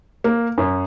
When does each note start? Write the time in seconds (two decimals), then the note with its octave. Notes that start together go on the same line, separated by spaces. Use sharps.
0.24 A#3
0.58 F#2